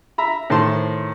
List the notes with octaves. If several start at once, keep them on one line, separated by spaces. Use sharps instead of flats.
E5 A#5 B5
A2 D#3 C5 A5 C6